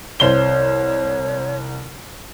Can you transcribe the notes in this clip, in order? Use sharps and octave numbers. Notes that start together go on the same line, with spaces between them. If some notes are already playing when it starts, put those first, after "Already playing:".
C2 C5 C#5 G7